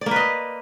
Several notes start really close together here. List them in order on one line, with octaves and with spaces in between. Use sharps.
D5 A#3 B4 D#5